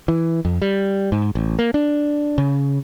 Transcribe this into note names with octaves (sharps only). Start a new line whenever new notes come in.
E3
F2
G3
G#2
A1
A#3
D4
C#3